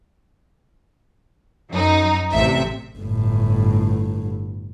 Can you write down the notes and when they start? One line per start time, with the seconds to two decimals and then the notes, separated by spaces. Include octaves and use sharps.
1.71 F#2 D#4
2.33 A1 C3 E5
2.98 G1 A2